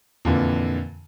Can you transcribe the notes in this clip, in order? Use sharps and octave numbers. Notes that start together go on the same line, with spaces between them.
F2 A#2 D3 E3